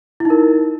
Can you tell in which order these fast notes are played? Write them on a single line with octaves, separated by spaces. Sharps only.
E4 D#4 A#4